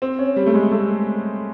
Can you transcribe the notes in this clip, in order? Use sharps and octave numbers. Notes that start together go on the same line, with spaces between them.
C4
C#4
G3
A3
G#3
A3